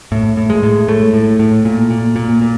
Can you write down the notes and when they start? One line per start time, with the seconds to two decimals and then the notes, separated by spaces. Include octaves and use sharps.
0.12 A2
0.37 A2
0.50 G#3
0.63 A2
0.88 A2 A3
1.13 A2
1.39 A2
1.65 A#2
1.90 A#2
2.16 A#2
2.42 A#2